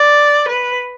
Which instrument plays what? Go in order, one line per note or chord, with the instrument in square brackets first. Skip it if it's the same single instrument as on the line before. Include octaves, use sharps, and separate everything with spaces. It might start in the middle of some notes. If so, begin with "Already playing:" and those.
Already playing: [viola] D5
B4